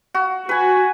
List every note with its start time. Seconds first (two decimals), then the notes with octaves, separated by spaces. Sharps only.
0.14 F#4
0.49 F#4 B4 G#5